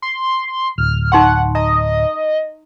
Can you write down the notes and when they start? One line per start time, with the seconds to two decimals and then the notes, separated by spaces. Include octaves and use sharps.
0.02 C6
0.78 D1 F6
1.12 D#4 F#5 C6 C#6
1.55 D#5 A#5